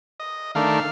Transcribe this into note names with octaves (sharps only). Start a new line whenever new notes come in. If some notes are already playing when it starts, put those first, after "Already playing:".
D#5
D#3 A3 D4 F5